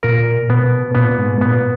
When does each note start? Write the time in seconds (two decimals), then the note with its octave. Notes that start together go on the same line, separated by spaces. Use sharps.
0.03 A#2 A#4
0.50 B2 B3
0.95 A#2 B3
1.18 G#2
1.41 A#2 B3